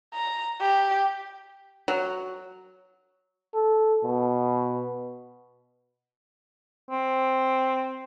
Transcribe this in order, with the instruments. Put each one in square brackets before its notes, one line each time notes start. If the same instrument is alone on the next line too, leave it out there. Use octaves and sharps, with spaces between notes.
[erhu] A#5
G4
[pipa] F#3
[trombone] A4
B2
[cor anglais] C4